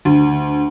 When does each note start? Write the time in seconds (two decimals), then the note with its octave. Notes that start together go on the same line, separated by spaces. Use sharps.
0.05 D2